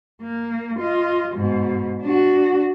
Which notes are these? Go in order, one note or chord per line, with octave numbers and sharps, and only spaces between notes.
A#3
F4 D#5
G#2 B2
D4 F#4